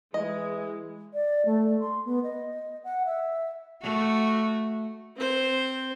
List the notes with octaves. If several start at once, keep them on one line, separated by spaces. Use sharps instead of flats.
E3 G#3 D#5
D5
A3
C6
B3
D#5
F#5
E5
A3 F#4
C4 C5